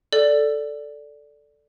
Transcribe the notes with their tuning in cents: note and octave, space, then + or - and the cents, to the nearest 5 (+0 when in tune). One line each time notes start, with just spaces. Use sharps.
A4 +0 D5 -5